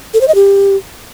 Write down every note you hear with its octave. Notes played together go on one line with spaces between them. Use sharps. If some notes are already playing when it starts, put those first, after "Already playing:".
A4
C5
D#5
G4